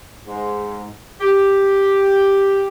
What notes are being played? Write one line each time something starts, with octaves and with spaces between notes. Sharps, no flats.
G#2
G4